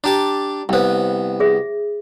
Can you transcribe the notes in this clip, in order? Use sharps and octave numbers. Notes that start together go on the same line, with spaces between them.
D4 G4 A5 A#5
C2 B3 C5 G5
G#4 E5